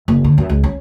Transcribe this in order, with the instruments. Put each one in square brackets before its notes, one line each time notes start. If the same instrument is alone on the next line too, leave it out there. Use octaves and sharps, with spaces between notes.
[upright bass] F#1
D3
F#2
C#2
C#4